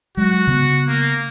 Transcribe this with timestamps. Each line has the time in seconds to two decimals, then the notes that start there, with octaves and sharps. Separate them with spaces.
0.17 F#3 G#3 F#4
0.47 C#3 B3
0.88 A#3